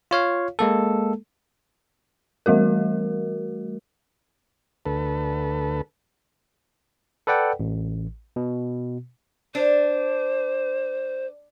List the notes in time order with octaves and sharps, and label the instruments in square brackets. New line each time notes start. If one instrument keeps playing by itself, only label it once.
[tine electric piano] F4 C#5 F5
G#3 A#3 A4
[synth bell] E3 G3 A3 F#4 A#4
[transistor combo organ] D2 A4 B4
[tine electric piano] A4 B4 D5 F#5 G5
A1
B2
[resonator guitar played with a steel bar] D4 [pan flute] C5